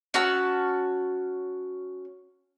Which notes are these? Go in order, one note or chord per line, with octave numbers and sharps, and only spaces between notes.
C#4 F#4 A5 E6